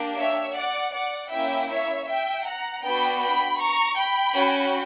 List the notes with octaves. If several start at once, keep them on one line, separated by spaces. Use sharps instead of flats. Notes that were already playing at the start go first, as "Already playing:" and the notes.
Already playing: A#3 D4 G4
C#5 E5
D5 F#5
D5 F#5
A#3 C#4 E4 E5 G5
C#5 E5
E5 G5
F#5 A#5
B3 D4 F#4 G5 B5
G5 B5
A#5 C#6
G5 B5
C#4 F#4